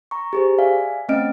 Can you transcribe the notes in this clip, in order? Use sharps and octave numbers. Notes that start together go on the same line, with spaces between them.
A#5 C#6
G4 G#4 C5
D5 E5 F5 G#5
A3 C4 C#4 D#5 F6 D7